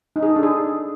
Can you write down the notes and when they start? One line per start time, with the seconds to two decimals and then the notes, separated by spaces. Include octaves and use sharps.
0.16 D#4
0.23 G#4
0.29 A4
0.36 D4
0.43 G#4